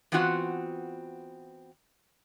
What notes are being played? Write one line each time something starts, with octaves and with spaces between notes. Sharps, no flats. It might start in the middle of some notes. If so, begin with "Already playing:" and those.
E3 B3 C4 F4 F#4 F#5